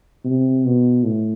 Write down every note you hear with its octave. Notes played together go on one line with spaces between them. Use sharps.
C3
B2
A2